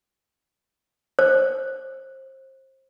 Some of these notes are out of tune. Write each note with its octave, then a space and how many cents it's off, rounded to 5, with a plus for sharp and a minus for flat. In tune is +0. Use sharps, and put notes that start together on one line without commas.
C5 +25